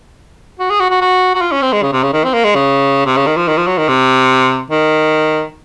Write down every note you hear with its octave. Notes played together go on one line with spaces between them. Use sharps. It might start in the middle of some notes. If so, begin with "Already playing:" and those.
F#4
G#4
F#4
F#4
F#4
F#4
F4
C#4
C4
G#3
C#3
C3
C#3
D#3
C4
A#3
G#3
C#3
C3
C#3
D#3
F3
D#3
F3
F#3
D#3
C3
D#3